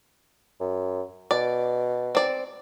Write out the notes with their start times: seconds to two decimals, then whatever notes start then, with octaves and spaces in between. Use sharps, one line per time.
0.60 F#2
1.31 B2 D5
2.15 C4 D5